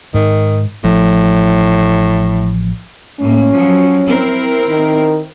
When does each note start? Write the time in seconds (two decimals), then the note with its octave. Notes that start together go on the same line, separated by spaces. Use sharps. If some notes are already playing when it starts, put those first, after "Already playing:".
0.14 G#2 D#3
0.84 A1 A2 F3
3.20 A2 A#3 C#4
3.54 F3 F#3
4.08 C4 E4 A#4
4.69 D#3